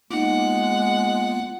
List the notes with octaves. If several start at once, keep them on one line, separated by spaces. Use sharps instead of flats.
G#3 A#3 B3 D#4 F4 F#5 D6